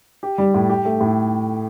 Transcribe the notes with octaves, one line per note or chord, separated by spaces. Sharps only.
G4
G3
A2
G4
A3
A2